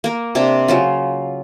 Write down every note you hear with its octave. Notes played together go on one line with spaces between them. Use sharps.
A#3 A#4
C3 C4 D4
C#3 F#3 F4